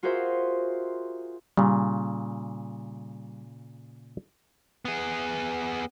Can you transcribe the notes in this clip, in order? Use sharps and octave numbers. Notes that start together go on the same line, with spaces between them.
F4 F#4 G#4 A#4 C5 E5
A#2 C#3 G3
B3 G#4